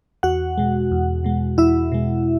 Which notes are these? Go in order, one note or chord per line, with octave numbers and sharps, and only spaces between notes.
E2 F#4 F#5
B2 G#3
E2
B2 G#3
E2 E4 E5
B2 G#3